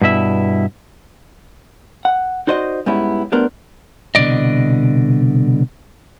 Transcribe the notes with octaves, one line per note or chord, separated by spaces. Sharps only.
G2 B2 E4 E5
F#5
D#4 F#4 C5 D5 D#5
G#2 G3 B3 C#4 E4
G3 A3 B3 D4 A#4 C5
C2 B2 D3 E3 D5 D#5